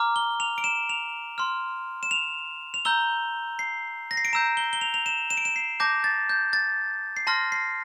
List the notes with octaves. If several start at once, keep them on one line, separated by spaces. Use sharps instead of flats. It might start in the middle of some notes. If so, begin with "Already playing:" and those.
Already playing: A#5 D6 F6
G7
F7
D7
E7
F7
C6 F6
E7
F7
F7
A#5 E6 G6 G7
C7
A#6
C7
D7
A#5 E6 G6 E7
G7
G7
F7
F7
E7
E7
D7
E7
C7
A5 D6 G6 A#6
A6
G6
A6
C7
A5 C6 F6 A#6
C7